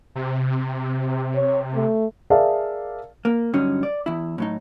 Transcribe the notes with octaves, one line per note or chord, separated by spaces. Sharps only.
C3
C#5
A3
G#4 A#4 D5 E5 F5 A5
A#3
G2 D3 F#3 C#4 D#4
D5
E2 E4
A2 F#3 D#4